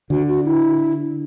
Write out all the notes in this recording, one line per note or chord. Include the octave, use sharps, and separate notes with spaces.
D3 F#4
F#4
E4